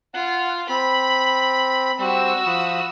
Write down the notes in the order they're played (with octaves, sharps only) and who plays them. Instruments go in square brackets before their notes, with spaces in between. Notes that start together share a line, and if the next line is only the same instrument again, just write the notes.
[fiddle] F4 [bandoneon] F#5
[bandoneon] C4 [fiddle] B5
[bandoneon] G3 C4 [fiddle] F#4 E6
[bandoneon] F3 B5 D#6